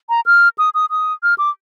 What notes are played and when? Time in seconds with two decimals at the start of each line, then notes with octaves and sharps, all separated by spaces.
0.09 A#5
0.26 F6
0.58 D#6
0.74 D#6
0.90 D#6
1.23 F6
1.38 D6